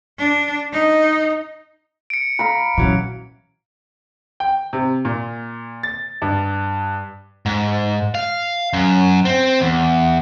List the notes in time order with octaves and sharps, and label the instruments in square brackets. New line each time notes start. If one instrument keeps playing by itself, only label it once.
[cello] D4
D#4
[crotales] C#7 D7
[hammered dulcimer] F5 A#5 B5
[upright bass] A#2 [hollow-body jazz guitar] E3 F#3 C#4
[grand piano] G5
C3
A#2
A6
G2
[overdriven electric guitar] G#2
F5
F#2
C4
E2